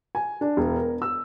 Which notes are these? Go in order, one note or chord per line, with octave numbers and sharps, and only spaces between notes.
G#5
D4
E1
A#4
E6